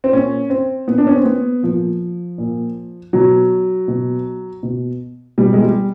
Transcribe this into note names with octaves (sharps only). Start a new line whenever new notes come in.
C4
A#2 C#4
C4
A#2 B3
D4
C#4
C4
B3
A#2 F3
A#2
B2 F#3
B2
B2
B2 G3
G#3
G3